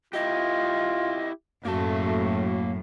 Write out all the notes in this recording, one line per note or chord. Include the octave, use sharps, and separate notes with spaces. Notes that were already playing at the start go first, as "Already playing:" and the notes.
E4 F4 G4 D#5
F#2 A2 A3 A#3 F#4 A5